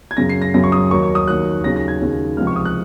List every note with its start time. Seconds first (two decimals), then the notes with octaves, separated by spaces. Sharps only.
0.11 G#6
0.17 F#2 C#3 F#3 A#6
0.29 C7
0.42 A#6
0.54 F#2 C#3 F#3 A#6
0.64 C#6
0.72 D#6
0.91 D#2 D#3 F#3 C#6
1.03 C#6
1.15 D#6
1.27 D#2 D#3 F#3 F#6
1.64 D#2 C#3 F#3 A#6
1.76 A#6
1.88 G#6
2.01 D#2 C#3 F#3
2.37 C#2 C3 F3 F6
2.47 C#6
2.56 D#6
2.65 F#6